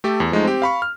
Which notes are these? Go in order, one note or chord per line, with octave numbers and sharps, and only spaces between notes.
A3 G4 A4
E2
F3 G#3 A3 D#4
C4 G4
F5 B5 C#6
F6